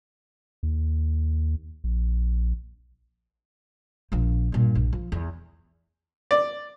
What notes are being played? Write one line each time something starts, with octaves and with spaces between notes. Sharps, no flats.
D#2
A#1
A#1 F3
G2 A#2
A#1
F3
E2
D5